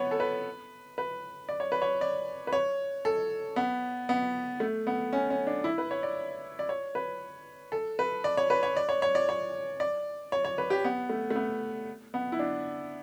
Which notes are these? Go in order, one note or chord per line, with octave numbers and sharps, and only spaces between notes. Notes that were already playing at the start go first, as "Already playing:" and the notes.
Already playing: B3 B4 C#5
A4
B4
B4
D5
C#5
B4
C#5
D5
B4
C#5
A4
B3
B3
A3
B3
C#4
C#4
D4
E4
B4
C#5
D5
D5
C#5
B4
A4
B4
D5
C#5
B4
C#5
D5
C#5
C#5
D5
C#5
D5
C#5
C#5
B4
G4
B3
A3
A3
B3
B3
E4
D4